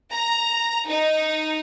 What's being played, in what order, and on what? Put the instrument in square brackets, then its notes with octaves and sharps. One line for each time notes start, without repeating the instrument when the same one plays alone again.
[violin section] A#5
D#4